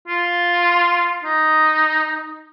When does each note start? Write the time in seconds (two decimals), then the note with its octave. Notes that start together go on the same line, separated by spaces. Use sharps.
0.08 F4
1.24 D#4